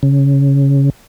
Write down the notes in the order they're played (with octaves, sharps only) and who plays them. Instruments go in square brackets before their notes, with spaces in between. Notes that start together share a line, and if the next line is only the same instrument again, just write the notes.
[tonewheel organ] C#3